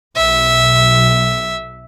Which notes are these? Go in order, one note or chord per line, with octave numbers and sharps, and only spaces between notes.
B1 E5